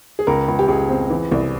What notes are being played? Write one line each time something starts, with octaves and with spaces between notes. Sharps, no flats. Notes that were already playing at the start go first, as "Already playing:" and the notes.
G#4
C#2 A#4
C#2
G4
C#2 G#4
C4
E3
C2